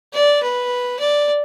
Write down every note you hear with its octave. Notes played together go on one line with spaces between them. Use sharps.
D5
B4
D5